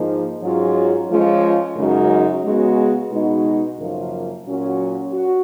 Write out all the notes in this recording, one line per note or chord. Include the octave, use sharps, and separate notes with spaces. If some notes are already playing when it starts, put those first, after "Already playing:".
Already playing: G#2 F3 A#3 D#4
G#2 F#3 C#4 F4
F3 G#3 C#4 F4
F#2 C#3 G#3 D#4 F#4
C#3 G#3 B3 F#4
B2 G#3 D#4 F#4
F#2 C#3 F3 A#3 F4
A#2 F#3 C#4 F#4
F#4